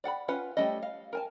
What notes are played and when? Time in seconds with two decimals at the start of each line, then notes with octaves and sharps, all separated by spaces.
0.04 D5 F#5 G#5 B5
0.28 C#4 F4 B4 F#5
0.57 G3 A3 C#4 D#5
0.83 F5
1.13 A#4 G#5 A5